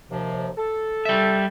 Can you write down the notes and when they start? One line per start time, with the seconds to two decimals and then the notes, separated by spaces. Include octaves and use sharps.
0.11 D#2 C3 F3
0.58 A4
1.05 G3 E5